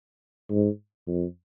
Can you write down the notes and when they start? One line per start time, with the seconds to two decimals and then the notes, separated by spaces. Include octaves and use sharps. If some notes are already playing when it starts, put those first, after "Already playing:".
0.51 G#2
1.07 F2